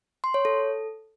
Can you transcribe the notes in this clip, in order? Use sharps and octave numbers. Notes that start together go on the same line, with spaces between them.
C6
C#5
A4